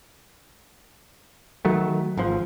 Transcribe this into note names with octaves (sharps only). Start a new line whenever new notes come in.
D#3 F#3 A3
G#1 F3